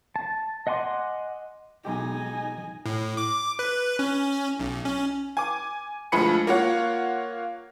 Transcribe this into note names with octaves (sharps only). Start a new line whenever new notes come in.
A5
D#5 F#5 G#5 C6 D6
B1 G#3 D#4 G4 G#5
A2
D6
B4
C#4
B1
C#4
G#5 D6
D2 F3 G#3 B5 C#7
A#3 F4 C#5 F#5